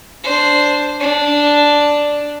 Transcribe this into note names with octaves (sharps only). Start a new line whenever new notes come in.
D4 C5
D4